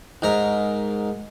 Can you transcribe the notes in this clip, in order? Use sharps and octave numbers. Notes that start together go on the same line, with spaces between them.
G#2 A#4